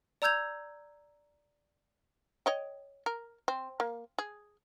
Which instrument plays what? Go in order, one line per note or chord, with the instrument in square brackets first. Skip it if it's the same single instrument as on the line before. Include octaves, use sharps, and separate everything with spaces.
[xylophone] D5 A#5 E6 G6 G#6 F7
[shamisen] C#5 D#5 G5
A#4
C4
A#3
G#4